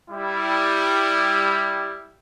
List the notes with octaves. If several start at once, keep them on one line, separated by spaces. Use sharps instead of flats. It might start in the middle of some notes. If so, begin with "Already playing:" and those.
G3 E4